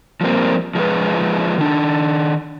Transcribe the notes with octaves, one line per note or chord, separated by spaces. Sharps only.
F3 G3 A#3 C4
F3 G#3 F4 B4
D#3 D4